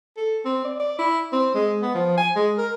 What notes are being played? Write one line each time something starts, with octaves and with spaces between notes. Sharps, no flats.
A4
C4
D5
D5
E4
C4
G#3
B3
F3
G#5
G#3
A#4